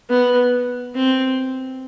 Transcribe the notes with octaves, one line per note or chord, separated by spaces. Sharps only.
B3
C4